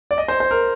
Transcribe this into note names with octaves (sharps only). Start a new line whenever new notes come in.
D5
D#5
C5
C5
A#4